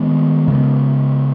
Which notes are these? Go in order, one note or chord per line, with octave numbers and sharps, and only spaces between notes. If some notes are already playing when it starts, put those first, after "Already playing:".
Already playing: D#3 G#3 B3
C#3 G#3 B3